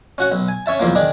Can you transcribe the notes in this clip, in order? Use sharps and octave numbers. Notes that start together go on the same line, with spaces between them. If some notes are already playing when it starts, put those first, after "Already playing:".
C#4 F#4 F#5
B1
G#5
C#4 C#5 E5 A5
B1 E2 F3 A#3
D#3 D4 G#4